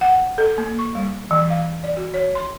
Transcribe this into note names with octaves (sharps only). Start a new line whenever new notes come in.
F#5
A4
A#3
C#6
G3
E3
F5
D5
F#4
C#5
C6